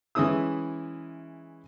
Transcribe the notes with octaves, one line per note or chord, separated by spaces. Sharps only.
E3 G#3 C#4 E4 D#6 E6